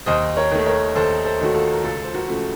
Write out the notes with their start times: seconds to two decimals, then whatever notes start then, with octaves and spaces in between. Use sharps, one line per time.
0.06 D#2 C5 D#5
0.36 A#4 C#5
0.52 D#3 A3
0.66 A#4 C#5
0.95 D#2 A4 C5
1.25 A4 C5
1.41 D#3 A3 F#4
1.55 F4 A4
1.72 A#4
1.84 C#2 F4 A4
2.04 C5
2.14 F#4 A#4
2.28 C#3 F3 A3